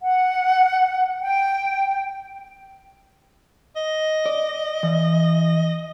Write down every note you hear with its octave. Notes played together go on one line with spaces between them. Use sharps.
F#5
G5
D#5
D5
E3